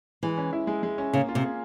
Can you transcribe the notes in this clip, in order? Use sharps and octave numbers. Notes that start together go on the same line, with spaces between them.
E3 G#3
C#4
E4
G#3
G#3
C#4
C#3 A#3
F4
C3
G#4